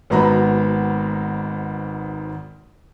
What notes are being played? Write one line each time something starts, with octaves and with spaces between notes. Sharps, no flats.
G#1 G#2 B3 F#4 A#5 B5